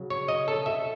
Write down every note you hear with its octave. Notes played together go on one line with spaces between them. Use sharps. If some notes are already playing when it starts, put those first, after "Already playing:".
Already playing: C#3 F#3
C#5
D#5
A4
E5